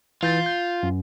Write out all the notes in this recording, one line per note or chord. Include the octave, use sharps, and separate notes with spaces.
E3 F4 G6 A6
G6
F#2